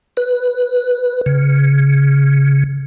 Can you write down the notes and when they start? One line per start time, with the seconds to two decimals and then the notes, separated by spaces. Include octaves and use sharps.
0.17 B4
1.26 C#3